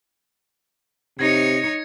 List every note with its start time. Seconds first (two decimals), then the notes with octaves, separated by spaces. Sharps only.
1.19 C3 D#4 C#5 G#6 A#6 C#7